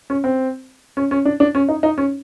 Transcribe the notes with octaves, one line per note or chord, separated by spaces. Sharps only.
C#4
C4
C#4
C#4
D4
D4
C#4
D#4
D#4
C#4